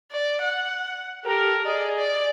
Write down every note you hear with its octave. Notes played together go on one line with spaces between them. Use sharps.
D5
F#5
G4 A4 A#4
G#4 D5 D#5
D5